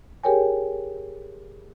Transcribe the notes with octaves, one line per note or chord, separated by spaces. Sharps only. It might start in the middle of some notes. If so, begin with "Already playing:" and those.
G4 G#4 A#4 C#5 G5 G#5